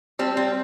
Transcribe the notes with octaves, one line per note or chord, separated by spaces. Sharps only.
G3 C4
C4